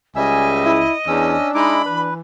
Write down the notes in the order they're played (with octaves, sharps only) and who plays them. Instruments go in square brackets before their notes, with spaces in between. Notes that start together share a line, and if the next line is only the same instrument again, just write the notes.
[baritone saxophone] C#2 [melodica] G3 E5 E6 [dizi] D#5 [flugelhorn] G#5
[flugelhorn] E4
[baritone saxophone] E2 [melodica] C#4 E6 [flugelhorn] D4
[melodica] G#3 E4 D6 [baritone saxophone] D#4 [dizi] B5
[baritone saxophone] E3 [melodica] B4